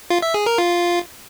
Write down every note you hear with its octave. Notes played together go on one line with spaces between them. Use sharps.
F4
E5
G#4
A#4
F4